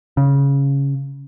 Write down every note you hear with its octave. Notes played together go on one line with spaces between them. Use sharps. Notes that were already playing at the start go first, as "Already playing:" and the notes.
C#3